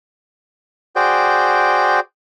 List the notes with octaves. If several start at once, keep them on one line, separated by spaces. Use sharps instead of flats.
F#4 G#4 C5 D5 G5